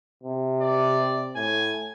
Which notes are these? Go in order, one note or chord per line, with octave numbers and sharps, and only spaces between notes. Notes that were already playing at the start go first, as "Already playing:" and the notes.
C3
D5
A2 G#5